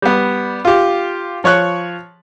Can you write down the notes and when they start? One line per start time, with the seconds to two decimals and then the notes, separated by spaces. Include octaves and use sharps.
0.02 G3 B3
0.65 F4 G4
1.44 F3 C#5 C#6 F#6